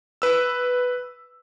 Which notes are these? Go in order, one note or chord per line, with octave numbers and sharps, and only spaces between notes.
B4 E6